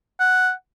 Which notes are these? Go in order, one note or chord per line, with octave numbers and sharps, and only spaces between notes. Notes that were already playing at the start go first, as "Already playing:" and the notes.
F#5